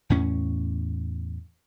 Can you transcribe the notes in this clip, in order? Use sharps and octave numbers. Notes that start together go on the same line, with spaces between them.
E2 A2 C#4